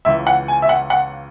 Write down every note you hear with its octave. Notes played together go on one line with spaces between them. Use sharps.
C#2 C#3 E3 E5
F#5
G#5
E5
F#5
F#5